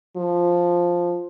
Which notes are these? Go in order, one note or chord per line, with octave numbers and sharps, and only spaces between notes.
F3